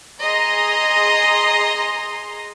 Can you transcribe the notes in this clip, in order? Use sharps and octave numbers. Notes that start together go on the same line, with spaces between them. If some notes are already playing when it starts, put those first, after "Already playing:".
G#4 D#5 A#5 C6